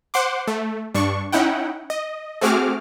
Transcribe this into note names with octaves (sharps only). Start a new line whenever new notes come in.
C5 F#5 C6 D6
A3
G2 D4 C#6
C#4 D#4 E4 F#5 G5
D#5
A3 C4 F#4 G#4 D6 F6